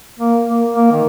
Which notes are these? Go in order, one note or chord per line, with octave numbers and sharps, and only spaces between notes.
A#3
A#3
A#3
D#3